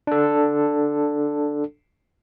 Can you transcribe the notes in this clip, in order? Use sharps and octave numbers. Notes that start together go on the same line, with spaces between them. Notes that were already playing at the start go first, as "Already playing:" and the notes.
D4 A4